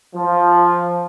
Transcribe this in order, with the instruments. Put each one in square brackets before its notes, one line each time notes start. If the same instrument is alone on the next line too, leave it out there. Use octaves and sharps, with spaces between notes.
[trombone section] F3